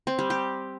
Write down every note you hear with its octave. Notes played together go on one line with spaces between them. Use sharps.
C4
G3
G4